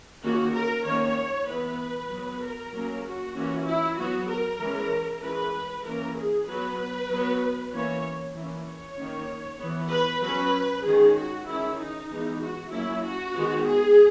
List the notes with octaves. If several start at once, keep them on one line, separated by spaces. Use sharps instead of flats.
D#3 A#3 C#4 F#4
A#4
D#3 A#3 C#4 C#5
E3 B3 B4
F#3 B3
A#4
F#3 A#3 C#4
F#4
E3 A#3 C#4
E4
F#3 B3 F#4
A#4
E3 G#3 C#4
E3 G#3 C#4 B4
E3 A#3 C#4 A#4
G#4
F#3 B3 B4
F#3 B3
E3 A#3 C#4 C#5
E3 A#3 C#4
C#5
D#3 A#3 C#4
E3 B3
B4
F#3 C#4 B4
D#3 G#3 C#4 G#4
F#4
D#3 G#3 C#4 E4
D#4
E3 G#3 B3
F#4
F#3 A#3 C#4 E4
F#4
D#3 G#3 B3
G#4